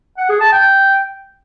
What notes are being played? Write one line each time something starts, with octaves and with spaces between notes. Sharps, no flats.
F#5
G#4
A5
G5